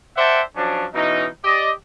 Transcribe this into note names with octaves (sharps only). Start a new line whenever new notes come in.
C5 D5 E5 F#5 G5 A5
F3 F#3 C#4 D4
B2 E3 C#4 D#4
G4 D5 D#5